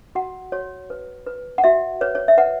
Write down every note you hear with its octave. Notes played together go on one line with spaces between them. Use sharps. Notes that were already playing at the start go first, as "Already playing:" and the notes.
F#4 F#5
F#4 C#5
B4
B4
F#5
F#4 E5
B4 C#5
C#5
E5
B4 F#5